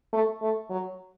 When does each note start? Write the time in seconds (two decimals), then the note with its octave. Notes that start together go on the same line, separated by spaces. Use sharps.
0.13 A3
0.42 A3
0.70 F#3